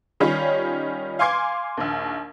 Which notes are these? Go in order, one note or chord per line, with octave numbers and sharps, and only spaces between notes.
D#3 G3 C#4 F4 C#5
F5 G#5 C6 D6 G#6 C7
A#1 D#2